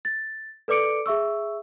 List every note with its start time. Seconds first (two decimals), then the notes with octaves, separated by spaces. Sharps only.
0.05 A6
0.68 A4 B4 D5 D6 C#7 D7
1.06 G#4 E5 C#6 E6